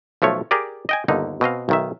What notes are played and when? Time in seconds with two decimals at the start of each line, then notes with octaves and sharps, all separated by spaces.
0.22 B1 F3 A3 C#5
0.51 G4 G#4 A#4 D5
0.89 D#5 G5 G#5
1.08 G1 D#2 D3 D#4
1.41 B2 C4 D#5 F5
1.69 B1 D#3 E5